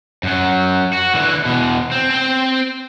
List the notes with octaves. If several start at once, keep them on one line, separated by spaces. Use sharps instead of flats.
F#2 F#3
F#4
D3 E3
B2 E3
C4
C4 G5